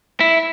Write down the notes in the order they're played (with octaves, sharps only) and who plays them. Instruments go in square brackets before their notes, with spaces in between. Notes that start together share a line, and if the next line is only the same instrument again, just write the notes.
[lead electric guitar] E4